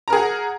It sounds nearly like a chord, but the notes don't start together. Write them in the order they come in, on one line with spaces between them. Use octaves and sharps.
A#5 A#4 G#4 F#5